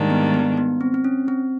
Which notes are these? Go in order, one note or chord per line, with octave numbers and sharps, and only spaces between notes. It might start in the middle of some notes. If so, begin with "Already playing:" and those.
Already playing: G#2 D#3 G3 A#3 D4
B3
B3
B3
C4
C4
C#4
C4